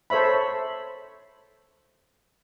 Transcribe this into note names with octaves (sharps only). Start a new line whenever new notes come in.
A4 C5 C#5 E5 B5